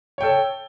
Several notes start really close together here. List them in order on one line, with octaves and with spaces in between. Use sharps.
C#5 G5 A4